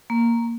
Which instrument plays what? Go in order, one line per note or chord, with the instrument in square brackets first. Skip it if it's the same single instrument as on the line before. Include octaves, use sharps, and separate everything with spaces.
[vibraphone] A#3